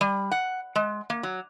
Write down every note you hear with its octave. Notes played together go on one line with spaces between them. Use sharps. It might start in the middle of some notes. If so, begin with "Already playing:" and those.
G3
F#5
G#3
A#3
F#3